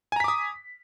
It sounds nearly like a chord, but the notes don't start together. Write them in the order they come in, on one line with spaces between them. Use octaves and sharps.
G#5 A#5 B6 D6 D#6